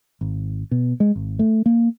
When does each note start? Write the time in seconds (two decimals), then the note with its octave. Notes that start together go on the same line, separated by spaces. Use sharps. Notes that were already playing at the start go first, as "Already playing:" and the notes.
0.21 G#1
0.71 B2
1.00 G#3
1.16 G#1
1.39 A3
1.66 A#3